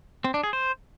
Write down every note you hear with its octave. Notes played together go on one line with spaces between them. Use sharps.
C4
D4
G#4
C5